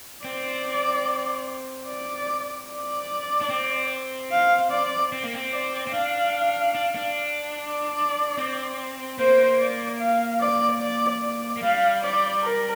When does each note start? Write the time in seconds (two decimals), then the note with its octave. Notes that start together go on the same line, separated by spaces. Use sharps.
0.24 C4 D5
1.87 D5
2.69 D5
3.41 D4
3.50 C4
4.31 F5
4.71 D5
5.12 C4
5.23 A#3
5.34 C4
5.53 D5
5.87 C4
5.93 D4 F5
6.75 D4
6.96 D4
7.57 D5
8.37 C4
9.18 A#3 C5
9.60 D5
10.00 F5
10.41 D5
10.81 D5
11.22 D5
11.57 A#3
11.63 G3 F5
12.02 D5
12.43 A#4